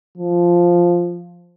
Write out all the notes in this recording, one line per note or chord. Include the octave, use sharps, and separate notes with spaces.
F3